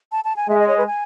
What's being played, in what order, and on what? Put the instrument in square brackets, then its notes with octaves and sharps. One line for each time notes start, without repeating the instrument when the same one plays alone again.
[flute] A5
A5
G#5
[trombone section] G#3 [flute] E5
[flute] D#5
C#5
B4
G#5